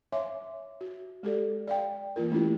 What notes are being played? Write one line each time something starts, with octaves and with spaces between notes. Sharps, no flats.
C#5 E5 F5 G#5 C6 D6
F#4
G#3 G4 A4 D5
D5 F5 G5
E3 A#3 F4 A#4
A3 C#4 E4 F4 G4